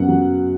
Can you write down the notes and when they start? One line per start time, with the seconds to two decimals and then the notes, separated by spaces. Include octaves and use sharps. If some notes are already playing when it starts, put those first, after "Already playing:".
Already playing: F#2 C#3 B3 F#5
0.08 F#3